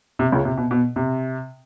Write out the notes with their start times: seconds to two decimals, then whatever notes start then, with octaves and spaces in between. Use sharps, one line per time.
0.19 C3
0.32 C#2 C#3
0.45 C3
0.58 B2
0.71 B2
0.96 C3